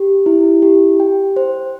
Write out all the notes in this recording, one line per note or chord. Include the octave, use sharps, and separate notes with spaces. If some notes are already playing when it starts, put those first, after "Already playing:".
Already playing: G4
E4
G4
G5
C5